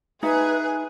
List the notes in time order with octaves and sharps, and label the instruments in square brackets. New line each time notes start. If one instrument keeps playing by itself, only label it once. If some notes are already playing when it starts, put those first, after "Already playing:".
[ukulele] D#4 E5 [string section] G#4 [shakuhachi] B4